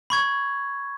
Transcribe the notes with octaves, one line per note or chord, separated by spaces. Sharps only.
B5 C#6 G#6